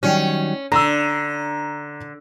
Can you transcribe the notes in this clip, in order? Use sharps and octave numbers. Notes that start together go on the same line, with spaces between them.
D#3 F#3 G3 C#4
D3 D4 A#5 E6